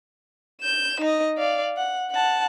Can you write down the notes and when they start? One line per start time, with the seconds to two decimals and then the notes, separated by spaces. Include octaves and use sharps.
0.62 G6 E7
1.00 D#4 D#5
1.38 D5 F5
1.77 F#5
2.11 F#5 A5